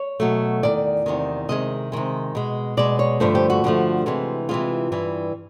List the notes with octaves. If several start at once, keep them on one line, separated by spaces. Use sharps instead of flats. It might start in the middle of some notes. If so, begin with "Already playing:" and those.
Already playing: C#5
B2 F#3 A3
E2 C3 D#3 D5
E2 C3 D#3
C3 D#3 G#3 D#5
C3 D#3 G#3
B2 G#3
B2 G#3 D5
C#5
G2 D3 F3 A3 C5
G4
F#4
G2 D3 F3 A3
C3 E3 G#3
C3 E3 G#3 F4
G2 E3 G3